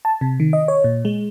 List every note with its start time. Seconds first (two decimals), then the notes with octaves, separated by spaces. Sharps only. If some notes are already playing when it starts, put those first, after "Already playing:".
0.05 A5
0.21 C3
0.40 D#3
0.53 D#5
0.68 C#5
0.84 A#2
1.05 G#3